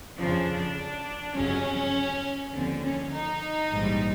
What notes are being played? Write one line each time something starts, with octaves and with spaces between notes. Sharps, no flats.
F2 C#3 F3 D4
G1 F2 C#3 F#3 C#4
D#2 D3 F3 C4
C#4
D#4
A#1 G#2 E3 G3